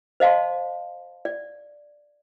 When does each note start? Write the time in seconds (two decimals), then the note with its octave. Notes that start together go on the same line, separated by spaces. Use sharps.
0.20 C5 D#5 F5 A5 C6
1.25 D5